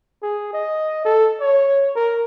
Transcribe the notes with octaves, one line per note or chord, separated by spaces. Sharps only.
G#4
D#5
A4
C#5
A#4